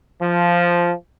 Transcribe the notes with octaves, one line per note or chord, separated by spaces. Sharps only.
F3